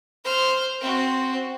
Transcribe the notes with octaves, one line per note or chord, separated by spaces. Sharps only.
C5 F6
C4 F#4